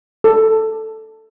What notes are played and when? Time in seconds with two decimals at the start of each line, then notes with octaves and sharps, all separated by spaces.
0.24 A4